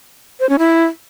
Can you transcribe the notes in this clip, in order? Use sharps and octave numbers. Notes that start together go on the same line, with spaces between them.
C5
C#4
E4